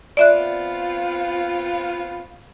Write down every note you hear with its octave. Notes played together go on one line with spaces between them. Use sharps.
B3 C4 F4 D5 E5 F#6